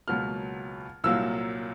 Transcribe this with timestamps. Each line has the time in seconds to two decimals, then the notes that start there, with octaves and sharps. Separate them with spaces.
0.08 C#2 B2 F#3 A#3 F6
1.04 C2 A#2 F#3 A#3 E6